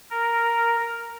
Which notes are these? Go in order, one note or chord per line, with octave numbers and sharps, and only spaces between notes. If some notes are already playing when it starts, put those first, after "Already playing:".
A#4